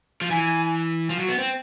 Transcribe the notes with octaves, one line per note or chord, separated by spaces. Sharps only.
F3
E3 G#5
F3
F#3
B3
C4